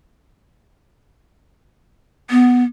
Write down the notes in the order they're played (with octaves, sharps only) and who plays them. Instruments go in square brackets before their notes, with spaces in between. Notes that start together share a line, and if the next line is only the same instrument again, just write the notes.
[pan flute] B3